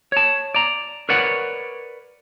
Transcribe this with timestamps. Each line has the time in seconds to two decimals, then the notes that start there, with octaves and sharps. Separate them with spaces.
0.12 C#5 A5
0.54 D5 A#5
1.09 A#4 B4 C#5 D5 F#5